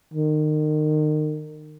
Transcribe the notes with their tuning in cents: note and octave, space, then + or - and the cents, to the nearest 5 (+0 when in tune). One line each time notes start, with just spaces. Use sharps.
D#3 -30